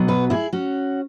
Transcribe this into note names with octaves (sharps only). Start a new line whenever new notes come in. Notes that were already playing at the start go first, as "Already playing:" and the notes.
Already playing: B2 F#3 B3
F#4 B4
E4 G#4
C#4 F#4